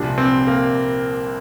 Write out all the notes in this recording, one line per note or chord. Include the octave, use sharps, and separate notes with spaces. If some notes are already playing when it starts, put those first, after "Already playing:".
Already playing: C2 A#2 F3 D4
C4
A#3